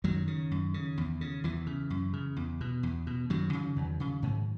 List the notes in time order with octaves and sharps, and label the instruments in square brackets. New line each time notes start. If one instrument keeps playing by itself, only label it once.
[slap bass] F#2 D#3 F#3
C#3
F#2
C#3
E2
C#3
E2 E3
C#3
F#2
C#3
E2
B2
E2
B2
F#2 D#3 F#3
C#3
E2
C#3
G#2